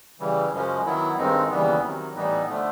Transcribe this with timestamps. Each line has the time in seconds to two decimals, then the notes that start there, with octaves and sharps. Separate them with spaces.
0.20 C#3 E3 G3
0.52 F#2 C#3 F3 G#3 C#4
0.85 D#3 F#3 B3 E4
1.17 G2 D#3 G#3 C4 D#4
1.50 D#2 C#3 E3 G3 B3
1.83 C3 D#3 F#3
2.15 A2 E3 G3 B3 D#4
2.48 D3 F3 A3